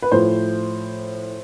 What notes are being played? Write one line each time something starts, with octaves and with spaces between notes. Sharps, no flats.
B4
A2 F3 C5